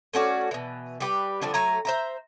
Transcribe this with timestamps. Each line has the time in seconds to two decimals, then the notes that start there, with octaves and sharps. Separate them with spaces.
0.14 A3 C#4 F#4 D5
0.51 B2 E3
1.00 G3 G4 B4
1.41 D3 F3 G3 D4
1.54 F#3 A3 G#5 A#5
1.85 C5 E5 A#5